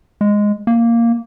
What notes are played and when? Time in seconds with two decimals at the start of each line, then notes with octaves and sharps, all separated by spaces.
0.21 G#3
0.67 A#3